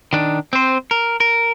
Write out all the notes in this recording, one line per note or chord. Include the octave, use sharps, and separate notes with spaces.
D#3 D4
C4 C5
A#4
A#4